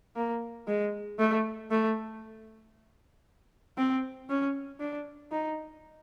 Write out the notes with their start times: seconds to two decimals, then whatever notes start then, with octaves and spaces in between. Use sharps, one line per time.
0.16 A#3
0.67 G#3
1.19 A3
1.71 A3
3.77 C4
4.29 C#4
4.80 D4
5.31 D#4